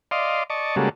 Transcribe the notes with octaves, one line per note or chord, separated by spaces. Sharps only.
D5 D#5 F5 C6
D5 D#5 A5 C#6
C#3 G3 G#3 A#3 F#4 A4